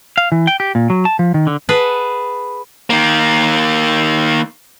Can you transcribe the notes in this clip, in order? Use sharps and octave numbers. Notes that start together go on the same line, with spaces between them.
F5
E3
G5
G4
A#2
F#3
A5
F3
D#3
D3
G#4 B4 F#5 A5
D#3 A#3